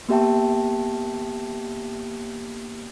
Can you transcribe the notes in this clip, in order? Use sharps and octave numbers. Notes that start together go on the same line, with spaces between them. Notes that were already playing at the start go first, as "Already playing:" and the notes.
A#3 B3 G4 E5 G5 A5